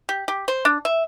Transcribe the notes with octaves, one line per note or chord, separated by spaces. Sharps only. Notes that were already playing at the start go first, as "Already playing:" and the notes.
G4
G4
C5
D4
E5